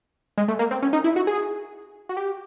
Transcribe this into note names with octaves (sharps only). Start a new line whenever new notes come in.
G#3
A3
A#3
C4
C#4
D#4
E4
F#4
G#4
F#4
G4